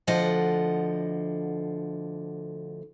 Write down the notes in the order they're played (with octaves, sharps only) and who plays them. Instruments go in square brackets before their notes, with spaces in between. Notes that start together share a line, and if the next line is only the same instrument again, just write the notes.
[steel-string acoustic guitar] D2 D3 F3 D#5 F#5